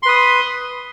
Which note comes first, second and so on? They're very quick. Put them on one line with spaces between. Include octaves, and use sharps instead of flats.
C6 B4 D#6